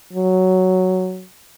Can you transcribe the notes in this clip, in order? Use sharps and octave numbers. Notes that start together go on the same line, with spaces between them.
F#3